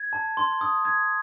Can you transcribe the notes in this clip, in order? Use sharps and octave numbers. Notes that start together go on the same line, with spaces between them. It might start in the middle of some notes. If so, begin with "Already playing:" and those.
Already playing: G#6
A5
C6
D#6
G#6